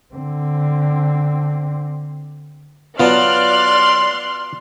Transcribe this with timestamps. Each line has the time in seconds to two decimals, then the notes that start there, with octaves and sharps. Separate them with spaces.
0.14 D3 C4
2.99 F#3 B3 D4 F4 D5 C6 F6 F#6